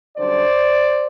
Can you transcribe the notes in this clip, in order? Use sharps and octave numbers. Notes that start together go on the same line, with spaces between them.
F#2 D3 G3 C5 D5